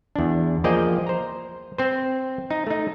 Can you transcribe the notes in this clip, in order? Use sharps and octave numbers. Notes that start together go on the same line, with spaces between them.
E2 D4
F3 A#3 G#4 D5 D#5 G5
C5 A#5
C4 C5
D#4
A3 D#4